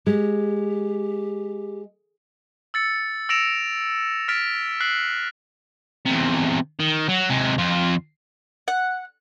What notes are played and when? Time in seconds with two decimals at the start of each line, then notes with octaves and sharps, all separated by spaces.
0.07 G#3 G4
2.74 E6 A6 C#7
3.29 E6 A#6 C#7 D7 E7 F7
4.28 F6 A6 B6 D7 F7
4.81 F#6 B6 C7 F#7
6.05 E2 C3
6.79 D#3
7.09 F#3
7.29 C3 G#3
7.58 F2 F4
8.68 F#5